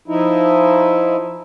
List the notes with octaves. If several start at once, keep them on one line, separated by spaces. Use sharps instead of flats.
F3 D#4 E4